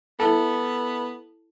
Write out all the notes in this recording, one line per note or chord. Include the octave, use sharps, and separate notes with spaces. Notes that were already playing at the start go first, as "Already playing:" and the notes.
B3 E4 A4